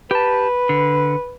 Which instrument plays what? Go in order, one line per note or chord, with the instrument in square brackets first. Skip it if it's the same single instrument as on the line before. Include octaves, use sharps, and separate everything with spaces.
[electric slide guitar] G4 A5 [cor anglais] B4
[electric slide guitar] D3